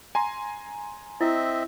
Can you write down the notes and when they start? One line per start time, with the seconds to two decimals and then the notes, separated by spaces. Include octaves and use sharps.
0.15 G#5 A#5 C6
1.21 C4 E4 D#5 E5